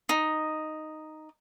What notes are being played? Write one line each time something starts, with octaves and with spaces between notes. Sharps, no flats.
D#4